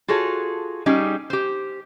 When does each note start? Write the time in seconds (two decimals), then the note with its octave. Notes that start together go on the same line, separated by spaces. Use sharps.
0.08 F4 F#4 G#4 A4 C#5
0.86 G3 C#4 D#4 G4 G#4
1.30 G4 C5